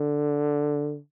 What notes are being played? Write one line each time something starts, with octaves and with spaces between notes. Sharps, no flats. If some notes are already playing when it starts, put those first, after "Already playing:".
Already playing: D3